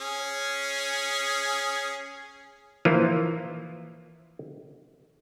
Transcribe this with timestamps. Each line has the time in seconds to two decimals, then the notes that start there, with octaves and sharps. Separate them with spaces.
0.01 C#4 G#4
2.85 E3 F3 A#3 F4